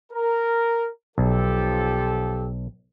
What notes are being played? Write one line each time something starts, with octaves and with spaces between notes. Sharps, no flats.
A#4
B1 F3 G4 A4